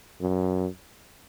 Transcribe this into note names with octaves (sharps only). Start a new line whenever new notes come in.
F#2